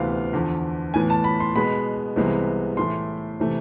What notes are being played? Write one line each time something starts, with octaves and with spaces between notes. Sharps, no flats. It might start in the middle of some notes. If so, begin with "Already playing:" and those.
Already playing: D2 C3 E3 B3 F5
E2 D3 F3
A2 E3 B3 G#5
A5
B5
C6
B2 G#3 B3 B5
C2 C3 E3 G#3 B3
A2 E3 A3 C6
C3 E3 A3